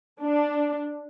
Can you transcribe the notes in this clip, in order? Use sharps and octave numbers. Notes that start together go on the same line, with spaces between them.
D4